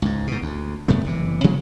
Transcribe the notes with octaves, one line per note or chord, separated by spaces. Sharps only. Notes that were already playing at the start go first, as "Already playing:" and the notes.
C#2 G#2
G#2 B2
D2
F#2 C3 A3 B3
F#1 C3 E3
C3 F3 G#3 B3